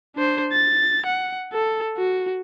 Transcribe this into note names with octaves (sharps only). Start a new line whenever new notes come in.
D4 C5
A6
F#5
A4
F#4